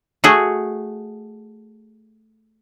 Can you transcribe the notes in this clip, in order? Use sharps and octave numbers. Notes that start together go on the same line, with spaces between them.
A3 F#4 G#4